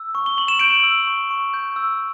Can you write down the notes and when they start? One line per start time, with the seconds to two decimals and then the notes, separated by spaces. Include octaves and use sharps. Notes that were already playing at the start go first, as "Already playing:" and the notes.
Already playing: E6
0.15 C#6
0.26 G7
0.37 C#6 F#7
0.48 E7
0.59 G6 D7 F#7
0.84 E6
1.07 C#6
1.30 C#6
1.54 G6
1.76 E6